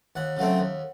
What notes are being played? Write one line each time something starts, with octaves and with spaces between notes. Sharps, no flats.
D#2 F#5
C#3 F#3 A3 C4
D#2